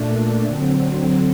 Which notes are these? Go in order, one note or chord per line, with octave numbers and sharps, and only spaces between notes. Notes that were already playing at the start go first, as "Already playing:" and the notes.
Already playing: A#2 A3 D4
D3 F#3 C4